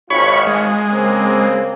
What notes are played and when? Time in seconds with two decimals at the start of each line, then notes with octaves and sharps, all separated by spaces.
0.10 G#1 F4 C#5 B5 C#6
0.47 G#3
0.91 C#3 A#3 C4